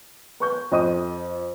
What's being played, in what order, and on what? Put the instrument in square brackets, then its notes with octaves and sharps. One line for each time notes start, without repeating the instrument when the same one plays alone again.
[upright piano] B4 C#6 G6
F2 D#5 D#6 D#7